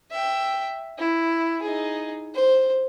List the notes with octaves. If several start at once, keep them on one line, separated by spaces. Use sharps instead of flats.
E5 G5
E4
D#4 G#4
C5